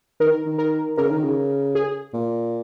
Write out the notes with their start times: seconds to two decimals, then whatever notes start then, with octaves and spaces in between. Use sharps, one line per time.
0.20 D#3 A#4
0.46 D#3
0.58 A#4
0.97 C#3 A#4
1.11 D#3
1.24 C#3
1.75 G#4
2.13 A#2